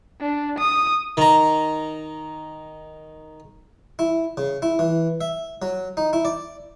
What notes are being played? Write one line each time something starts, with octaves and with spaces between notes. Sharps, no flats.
D4
D#6
D#3 A#5
E4
C#3
E4
E3
E5
F#3
D#4
E4
D5